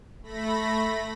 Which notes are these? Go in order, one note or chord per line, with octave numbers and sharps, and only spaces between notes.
A3 B5 A#6